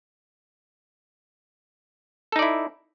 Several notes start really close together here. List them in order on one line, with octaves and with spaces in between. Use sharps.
A4 D#4 D5 E4